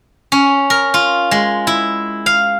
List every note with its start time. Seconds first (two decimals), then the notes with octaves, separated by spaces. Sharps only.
0.32 C#4
0.70 A#4
0.94 F4
1.31 G#3
1.67 E4
2.26 F5